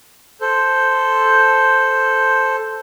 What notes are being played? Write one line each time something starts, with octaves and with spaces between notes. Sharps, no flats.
A4 C5